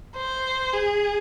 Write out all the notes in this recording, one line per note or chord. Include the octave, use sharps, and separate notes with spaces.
C5
G#4